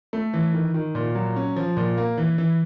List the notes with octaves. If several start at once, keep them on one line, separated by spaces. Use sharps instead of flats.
A3
E3
D#3
D#3
A#2
F#3
C#4
F3
A#2
A#3
E3
E3